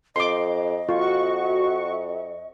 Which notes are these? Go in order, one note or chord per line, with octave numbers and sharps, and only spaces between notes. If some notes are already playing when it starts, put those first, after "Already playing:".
F2 D#5 C6 D6
F2 F4 F#4 C#6